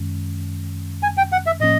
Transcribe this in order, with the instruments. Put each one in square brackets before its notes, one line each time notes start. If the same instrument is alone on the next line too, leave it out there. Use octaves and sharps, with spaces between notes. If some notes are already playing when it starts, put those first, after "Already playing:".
Already playing: [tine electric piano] F#2 D#3 G#3 C#4
[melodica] G#5
G5
F#5
E5
[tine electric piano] A2 F3 A#3 C#4 [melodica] D#5